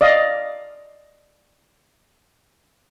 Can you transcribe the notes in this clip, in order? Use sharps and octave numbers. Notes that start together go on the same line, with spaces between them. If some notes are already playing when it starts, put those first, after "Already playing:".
D5 D#5 F5